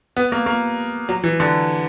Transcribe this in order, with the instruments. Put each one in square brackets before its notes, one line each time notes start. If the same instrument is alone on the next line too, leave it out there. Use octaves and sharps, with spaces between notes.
[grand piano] B3
A#3
A#3
F#3
E3
D3